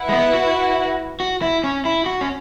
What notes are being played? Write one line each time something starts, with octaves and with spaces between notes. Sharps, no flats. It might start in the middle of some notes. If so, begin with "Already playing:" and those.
Already playing: E4 B4 F#5
G#3
B3
F#4
F#4
E4
C#4
E4
F#4
C#4